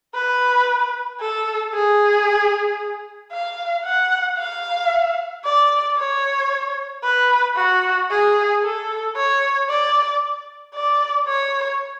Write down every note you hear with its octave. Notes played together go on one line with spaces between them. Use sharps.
B4
A4
G#4
F5
F#5
F5
D5
C#5
B4
F#4
G#4
A4
C#5
D5
D5
C#5